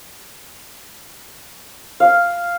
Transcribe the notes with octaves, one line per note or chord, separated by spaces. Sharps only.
F5